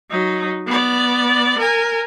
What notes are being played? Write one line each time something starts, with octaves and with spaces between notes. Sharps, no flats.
F#3 D#4
B3 D5
A#4 G#5